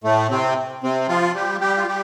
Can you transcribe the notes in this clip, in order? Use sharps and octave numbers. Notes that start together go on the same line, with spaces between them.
A2 A3
C3 C4
C3 C4
F3 F4
G3 G4
G3 G4
F4
G3 G4